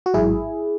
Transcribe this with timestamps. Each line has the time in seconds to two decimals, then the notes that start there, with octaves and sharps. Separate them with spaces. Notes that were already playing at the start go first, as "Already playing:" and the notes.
0.06 F#4
0.14 A1 G#2 F#3 E4 G#4